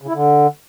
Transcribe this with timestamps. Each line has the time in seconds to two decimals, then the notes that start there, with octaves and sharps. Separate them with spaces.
0.02 C#3
0.08 E4
0.14 D3